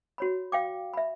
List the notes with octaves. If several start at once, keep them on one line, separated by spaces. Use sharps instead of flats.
F#4 C#5 B5
F5 G5 D6
E5 B5